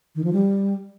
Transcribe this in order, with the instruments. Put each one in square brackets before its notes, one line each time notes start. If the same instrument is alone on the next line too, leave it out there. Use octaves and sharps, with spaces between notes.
[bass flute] D#3
F3
G3